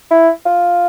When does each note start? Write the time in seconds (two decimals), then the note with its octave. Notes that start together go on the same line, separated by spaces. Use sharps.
0.11 E4
0.46 F4